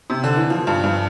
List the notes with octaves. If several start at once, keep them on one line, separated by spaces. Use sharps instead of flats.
C3
D3
E3
F3
G2
G2